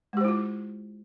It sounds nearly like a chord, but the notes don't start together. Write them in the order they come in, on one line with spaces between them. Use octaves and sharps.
G#3 G4 C5 E4 F4